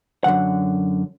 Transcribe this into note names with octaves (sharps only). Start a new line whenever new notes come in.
F#2 D3 D#3 F#5